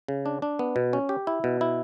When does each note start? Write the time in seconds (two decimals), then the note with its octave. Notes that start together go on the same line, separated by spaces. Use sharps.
0.08 C#3
0.26 D4
0.42 D4
0.59 B3
0.76 B2
0.93 C#4
1.09 G4
1.27 E4
1.44 B2
1.61 E4